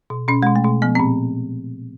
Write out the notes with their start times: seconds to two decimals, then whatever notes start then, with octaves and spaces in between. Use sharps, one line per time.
0.10 B2
0.28 B2 C#4
0.43 B2 G#3
0.56 A3
0.64 B2
0.82 F3 B3
0.95 A#2 C4